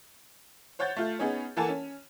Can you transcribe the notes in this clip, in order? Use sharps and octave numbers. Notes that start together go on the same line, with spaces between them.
C5 C#5 F#5 G6 A6
A3 F4
B3 C#4 D#4 G#4 C#5
E3 A#3 A4 F#5 G#5 A5
C#4